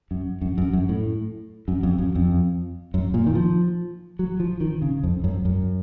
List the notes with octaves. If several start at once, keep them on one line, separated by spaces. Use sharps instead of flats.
F#2
F#2
F#2
F#2
A2
F#2
F2
F#2
F2
F#2
A#2
D#3
F3
F#3
F3
D#3
C#3
F2
F#2
F#2